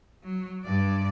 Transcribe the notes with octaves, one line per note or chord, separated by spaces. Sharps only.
F#3
G2 D5